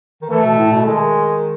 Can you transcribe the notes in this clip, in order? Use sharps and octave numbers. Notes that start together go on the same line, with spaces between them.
D#3
E3 A3
B2
A2
B2
D#3 G#3